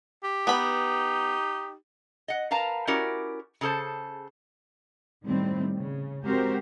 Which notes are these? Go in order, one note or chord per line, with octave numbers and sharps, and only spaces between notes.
G4
B3 D#4 B5
D#5 F#5
A#4 B4 F5 A5 A#5
C#4 E4 F#4 G4 A#4 D5
C#3 G#4 A4 C5 A5
A2 D#3 G3 C4
C#3
G#3 C4 F#4 G4 A#4 C5